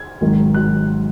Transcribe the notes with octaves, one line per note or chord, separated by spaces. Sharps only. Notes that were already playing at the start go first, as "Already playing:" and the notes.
Already playing: G#6
G#1 G#2 D#3 F#3
D#3 F#3 F#6